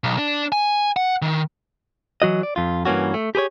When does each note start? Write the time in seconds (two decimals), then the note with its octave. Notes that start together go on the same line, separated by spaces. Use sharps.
0.04 B1
0.18 D4
0.52 G#5
0.96 F#5
1.22 D#3
2.22 E3 F#3 F#4 D#5
2.43 D5
2.56 F2 F4
2.85 G2 E3 A#3 C#4 F#4
3.14 A3
3.35 G4 G#4 B4 C#5